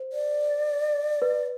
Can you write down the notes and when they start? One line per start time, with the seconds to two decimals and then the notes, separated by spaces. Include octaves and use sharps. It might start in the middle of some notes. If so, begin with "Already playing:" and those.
Already playing: C5
0.13 D5
1.22 B4